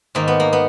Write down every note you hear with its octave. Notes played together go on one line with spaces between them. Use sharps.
G#2 D#3 A#3
B3
A#3
B3